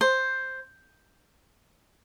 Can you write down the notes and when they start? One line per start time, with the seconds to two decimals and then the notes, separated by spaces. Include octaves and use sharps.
0.01 C5